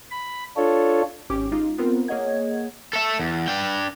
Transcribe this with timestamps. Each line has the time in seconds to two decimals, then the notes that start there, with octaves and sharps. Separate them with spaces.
0.11 B5
0.57 D4 F4 A4 C#5
1.30 G#1 C#4 G4 D6
1.52 G#3 D#4 F4
1.78 B3 C4 F4 A#4 C5
2.08 A#3 G#4 C#5 D#5 F#5 G#6
2.93 A4 E5
3.19 E2
3.48 D4 G5